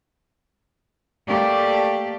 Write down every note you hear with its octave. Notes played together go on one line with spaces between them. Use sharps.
A3 A#3 G4 D5